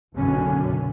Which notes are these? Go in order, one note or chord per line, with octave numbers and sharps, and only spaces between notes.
F#1 B1 F#2 B2 D3 C#4